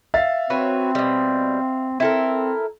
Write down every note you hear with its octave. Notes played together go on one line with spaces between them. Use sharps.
E5 F5 A6
C4 F#4 B4 C#5
B2 G3
C4 E4 A4 A#4